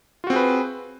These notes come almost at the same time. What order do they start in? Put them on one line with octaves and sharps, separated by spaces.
F4 F#4 C4 G#4 B4